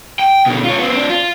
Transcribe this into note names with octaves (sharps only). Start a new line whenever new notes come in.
G5
B2 D3
F4 C#5
B3 C4
C4 D4
F4